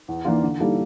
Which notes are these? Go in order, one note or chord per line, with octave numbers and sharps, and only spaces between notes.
E2
E3 A#3 D4 F4
D3
G3 A#3 E4 A4